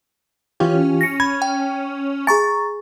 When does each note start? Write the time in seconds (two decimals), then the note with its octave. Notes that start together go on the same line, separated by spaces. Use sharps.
0.60 E3 C#4 F4 G4
1.01 A#6 C#7
1.20 B5 G#6
1.42 G5
2.27 G#4 G#5 A#5 C#6 A6